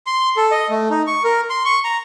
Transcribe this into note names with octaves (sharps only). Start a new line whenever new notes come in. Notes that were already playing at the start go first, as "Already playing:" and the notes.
C6
A4
D#5
A3
D#4
C#6
A#4
C6
C#6
A#5